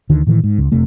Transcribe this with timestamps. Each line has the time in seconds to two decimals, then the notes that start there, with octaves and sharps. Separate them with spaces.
0.09 D2 D3 D#3
0.27 A2 D#3 E3
0.44 G#2
0.58 C#2
0.72 F1 C3 A3